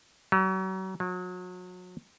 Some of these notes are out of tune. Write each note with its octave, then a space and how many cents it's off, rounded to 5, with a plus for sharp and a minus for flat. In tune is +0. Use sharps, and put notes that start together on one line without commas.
F#3 +35
F#3 -35